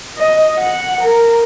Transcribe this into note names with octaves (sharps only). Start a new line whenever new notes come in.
D#5
F#5
A#4